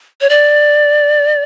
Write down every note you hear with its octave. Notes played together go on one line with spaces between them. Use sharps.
C#5
D5